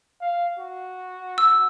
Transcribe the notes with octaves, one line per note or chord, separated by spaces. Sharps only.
F5
F#4
E6